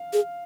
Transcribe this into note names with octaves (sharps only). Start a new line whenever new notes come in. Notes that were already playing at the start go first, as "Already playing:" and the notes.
Already playing: F5
G#4